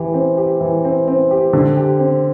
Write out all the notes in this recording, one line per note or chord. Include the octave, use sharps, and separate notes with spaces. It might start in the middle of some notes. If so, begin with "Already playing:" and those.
Already playing: E3 G4
C4
G4
E3
C4
C4
G4
D3
G4
C4